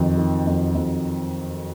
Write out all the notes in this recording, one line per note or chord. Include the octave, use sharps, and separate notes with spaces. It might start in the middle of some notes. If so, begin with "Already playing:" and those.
Already playing: F2 D#3 F#3
D#3
F2
F2